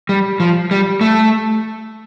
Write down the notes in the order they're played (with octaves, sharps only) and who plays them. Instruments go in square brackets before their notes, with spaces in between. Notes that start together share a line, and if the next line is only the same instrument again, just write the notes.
[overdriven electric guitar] G3
F3
G3
A3